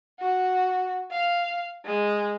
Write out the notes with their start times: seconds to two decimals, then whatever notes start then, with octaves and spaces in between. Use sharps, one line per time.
0.20 F#4
1.11 F5
1.85 G#3